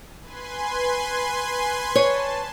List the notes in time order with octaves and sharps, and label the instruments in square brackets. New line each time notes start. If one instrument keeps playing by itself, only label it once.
[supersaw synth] B4 G#5 C6
[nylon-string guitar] C#5 [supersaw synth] A5